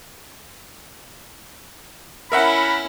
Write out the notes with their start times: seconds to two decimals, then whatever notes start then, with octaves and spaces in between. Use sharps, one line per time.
2.32 C#4 E4 A#4 E5 F#5 B5